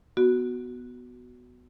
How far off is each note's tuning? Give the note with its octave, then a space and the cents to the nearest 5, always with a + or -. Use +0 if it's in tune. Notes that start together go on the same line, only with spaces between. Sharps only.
B3 +0 F#4 +0